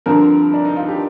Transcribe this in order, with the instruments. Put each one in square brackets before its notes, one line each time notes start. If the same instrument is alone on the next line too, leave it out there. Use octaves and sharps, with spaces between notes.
[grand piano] G2 D3 F3 C4 [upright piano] A#4
[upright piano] D4
D#4
F4
G4